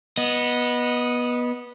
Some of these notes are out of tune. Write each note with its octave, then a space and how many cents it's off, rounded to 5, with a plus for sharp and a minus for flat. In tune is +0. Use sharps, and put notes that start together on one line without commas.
B3 -15 D#5 +0